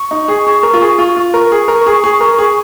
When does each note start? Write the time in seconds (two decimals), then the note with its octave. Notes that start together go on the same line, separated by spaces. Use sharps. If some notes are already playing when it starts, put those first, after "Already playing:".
Already playing: C#6
0.11 D#4
0.28 G#4
0.47 G#4
0.63 A#4
0.73 F4
0.81 G#4
0.98 F4
1.16 F4
1.34 A#4 C#6
1.52 G#4
1.68 A#4
1.86 G#4
2.04 G#4
2.21 A#4
2.39 G#4